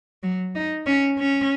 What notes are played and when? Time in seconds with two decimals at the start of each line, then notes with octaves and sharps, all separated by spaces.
0.23 F#3
0.56 D#4
0.87 C#4
1.19 C#4